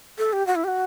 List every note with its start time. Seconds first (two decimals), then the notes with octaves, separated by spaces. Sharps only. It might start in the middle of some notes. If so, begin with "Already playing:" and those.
0.18 A4
0.33 G4
0.47 F#4
0.56 E4
0.64 G4
0.68 F#4